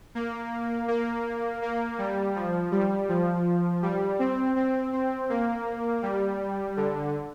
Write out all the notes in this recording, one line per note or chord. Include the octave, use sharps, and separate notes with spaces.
A#3
A#3
A#3
G3
F3
G3
F3
G3
C4
C4
C4
A#3
G3
D3